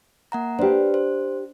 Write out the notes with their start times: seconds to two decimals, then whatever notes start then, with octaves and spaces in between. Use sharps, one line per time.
0.32 A#3 F#5 A#5
0.59 D4 G4 B4 C5
0.94 C5